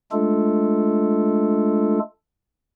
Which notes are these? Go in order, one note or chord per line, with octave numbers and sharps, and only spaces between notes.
G#3 A3 D4 F4 A4